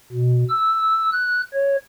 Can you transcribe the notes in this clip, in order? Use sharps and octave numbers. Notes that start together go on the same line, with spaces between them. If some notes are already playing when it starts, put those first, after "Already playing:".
B2
E6
F#6
C#5